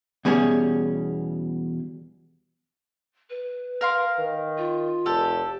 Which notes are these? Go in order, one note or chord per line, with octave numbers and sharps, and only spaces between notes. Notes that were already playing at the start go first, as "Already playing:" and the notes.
E2 B2 G3 C#4 G#4
B4
A#4 F5 C6
D#3
F4
F1 G4 A4